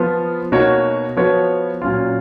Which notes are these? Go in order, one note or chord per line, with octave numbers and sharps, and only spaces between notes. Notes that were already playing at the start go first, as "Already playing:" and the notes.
Already playing: F3 B3 F4
B2 A#3 D#4 F#4 C#5
F3 B3 F#4 C#5
A#2 F#3 C#4 F4